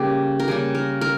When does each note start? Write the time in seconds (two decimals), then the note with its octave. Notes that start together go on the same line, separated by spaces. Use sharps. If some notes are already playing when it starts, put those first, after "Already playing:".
Already playing: C#3 G3 A#3 G4
0.40 A#4
0.48 C#3 G3 A#3 G#4
0.75 A#4
1.01 A#4